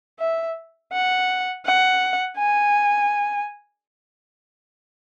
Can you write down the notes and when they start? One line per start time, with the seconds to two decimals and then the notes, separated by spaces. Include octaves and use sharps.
0.20 E5
0.93 F#5
1.66 F#5
2.38 G#5